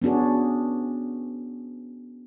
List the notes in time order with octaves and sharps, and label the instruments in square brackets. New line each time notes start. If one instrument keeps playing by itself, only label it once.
[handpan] B3 C#4 D4 F#4 G#4